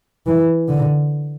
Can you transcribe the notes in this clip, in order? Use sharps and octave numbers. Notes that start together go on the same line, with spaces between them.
E3
D3